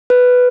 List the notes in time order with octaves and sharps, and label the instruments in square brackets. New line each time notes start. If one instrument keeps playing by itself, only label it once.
[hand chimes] B4